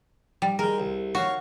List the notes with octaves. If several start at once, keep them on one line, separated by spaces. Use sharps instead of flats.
G3
G#3 A#4 G5
C2
F#4 C#5 F5